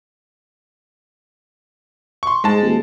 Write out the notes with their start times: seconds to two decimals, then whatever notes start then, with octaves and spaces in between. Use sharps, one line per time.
2.23 C6 C#6
2.44 G#2 G#3 A5
2.62 D#1